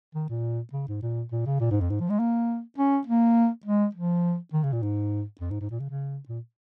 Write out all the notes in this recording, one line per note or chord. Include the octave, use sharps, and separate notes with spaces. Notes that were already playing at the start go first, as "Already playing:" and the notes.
D#3
A#2
C#3
G#2
A#2
A#2
C#3
A#2
G#2
F2
G#2
F3
G#3
A#3
C#4
A#3
G#3
F3
D#3
C#3
A#2
G#2
F2
G#2
G#2
A#2
C#3
C#3
A#2